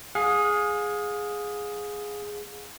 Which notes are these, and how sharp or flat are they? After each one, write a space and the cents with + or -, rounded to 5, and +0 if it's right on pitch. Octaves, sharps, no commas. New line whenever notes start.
G#4 +0 F5 +40